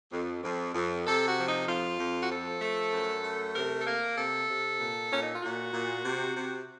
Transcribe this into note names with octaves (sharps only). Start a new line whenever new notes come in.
F2
F2
F2
C3 A4
F#4
F3
D#4
F2 F4
F2
F#4
F3 A4
A3
F#2
A3
C3 A#4
A4
A#3 A#4
C3 A4
C3
A#2
A#2 C#4
D#4
F4
A#2 F#4
A#2
C3
C3